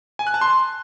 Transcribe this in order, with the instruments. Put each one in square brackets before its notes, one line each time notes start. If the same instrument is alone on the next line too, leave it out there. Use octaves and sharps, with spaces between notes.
[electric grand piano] G#5
F#6
A5
C6